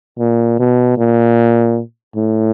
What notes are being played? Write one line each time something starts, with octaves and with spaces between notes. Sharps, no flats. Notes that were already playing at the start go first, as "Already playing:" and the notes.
A#2
B2
A#2
A2